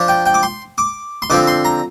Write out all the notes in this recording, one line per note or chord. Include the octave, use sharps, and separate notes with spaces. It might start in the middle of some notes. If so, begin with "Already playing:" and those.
Already playing: F3 D4
G5
G5
D6
C6
D6
C6
D3 F3 C4 D6
C6
A#5